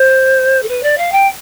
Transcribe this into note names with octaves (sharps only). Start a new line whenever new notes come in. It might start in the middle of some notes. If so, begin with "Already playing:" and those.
Already playing: C5
A4
B4
D5
F5
G5